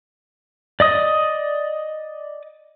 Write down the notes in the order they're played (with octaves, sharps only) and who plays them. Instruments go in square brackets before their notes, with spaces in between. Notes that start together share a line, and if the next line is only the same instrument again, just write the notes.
[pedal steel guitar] D5 D#5 D#6